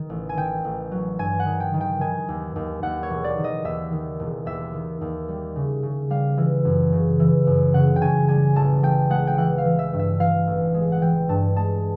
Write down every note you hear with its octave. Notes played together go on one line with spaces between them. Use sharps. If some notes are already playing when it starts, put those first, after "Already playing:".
Already playing: D#3
A1
G#5
D#3 G5
A1
F#3
G2 G#5
F#5
D#3
G5
D#3
G5
D#3 G#5
D#2
D#2
D#2 F#5
C#5
E1
D5
D#3
D#5
D#2 E5
D#3
E1
D#2 E5
D#3
D#2
G3
C#3
C#3
G3 F5
E3
F#2
C#3
E3
F#2
C#3 F#5
G5
C#3 G#5
G3 G#5
A1 A5
A1 G5
G#3 F#5
G5
E3 F#5
F5
E3
E5
G2
E5
E3 F5
A1
G#3
F#5
E3 G5
G2 A5
G#3 A5